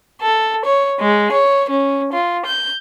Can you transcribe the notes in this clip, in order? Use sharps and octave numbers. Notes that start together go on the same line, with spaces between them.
A4
C#5
G#3
C#5
C#4
F4
G6